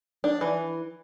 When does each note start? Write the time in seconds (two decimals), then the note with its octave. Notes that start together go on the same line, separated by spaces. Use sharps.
0.24 D4
0.41 E3